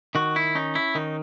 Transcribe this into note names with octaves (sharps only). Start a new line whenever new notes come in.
D#3 F#4
E4
C#4 D#4
E4
D#3 D#4